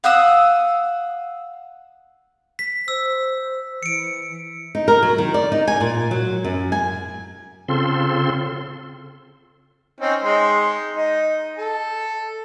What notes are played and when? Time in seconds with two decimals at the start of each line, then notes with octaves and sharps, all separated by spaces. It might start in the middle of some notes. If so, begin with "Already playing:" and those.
0.04 F5 F#5 D#6 E6
2.59 B6
2.88 C5 E6
3.83 E3 C#7 D7
4.75 D#4
4.88 A#4
5.03 F#3
5.18 D#3
5.34 D5
5.52 D#4
5.68 G#5
5.81 A#2
6.11 F#3
6.44 F#2
6.72 G#5
7.68 C#3 C4 F4 A4 C6
10.00 C4 C#4 D#4
10.23 G#3 D#4 C6
10.97 D#4
11.58 A4